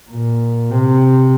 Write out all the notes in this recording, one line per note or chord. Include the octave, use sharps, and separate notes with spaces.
A#2
C3